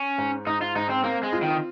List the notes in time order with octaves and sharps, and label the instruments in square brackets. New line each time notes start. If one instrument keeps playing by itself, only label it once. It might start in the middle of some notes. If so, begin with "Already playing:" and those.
Already playing: [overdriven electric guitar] C#4
[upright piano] G#2
[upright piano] G#2 [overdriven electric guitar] D#4
[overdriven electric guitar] F4
[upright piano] G#2 [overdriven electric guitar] D#4
[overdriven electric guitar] C4
[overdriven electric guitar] A#3 [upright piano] C4
[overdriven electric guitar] G#3
[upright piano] F4
[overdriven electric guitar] D#3